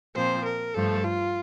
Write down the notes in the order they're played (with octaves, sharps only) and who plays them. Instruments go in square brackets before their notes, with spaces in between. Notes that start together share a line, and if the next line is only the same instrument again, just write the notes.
[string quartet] A#2 F3 C4 [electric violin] C5
[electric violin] A#4
[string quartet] G2 F3 A3 [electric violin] A4
[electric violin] F4